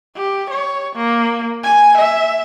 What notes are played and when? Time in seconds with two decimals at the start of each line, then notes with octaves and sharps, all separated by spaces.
0.16 G4
0.50 C#5
0.96 A#3
1.64 G#5
1.97 E5